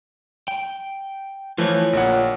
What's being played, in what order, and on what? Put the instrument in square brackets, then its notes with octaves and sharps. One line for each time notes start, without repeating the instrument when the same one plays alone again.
[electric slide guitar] G5
[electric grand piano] E3 F3 A3 [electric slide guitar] F4 C#5
[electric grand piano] A#1 A#3 F#5